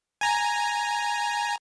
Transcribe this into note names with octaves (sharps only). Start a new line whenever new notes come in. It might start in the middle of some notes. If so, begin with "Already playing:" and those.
G#5 A#5